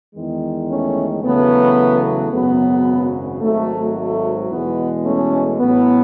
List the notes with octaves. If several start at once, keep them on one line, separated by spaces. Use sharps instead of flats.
E2 D#3 G#3
A3 C#4
E2 C#3 F#3 A3 B3
G#1 F#2 C#3 F#3 B3
G#1 G#2 F#3 A3
A3
E2 B2 G#3 B3
A3 C#4
A1 A2 F#3 B3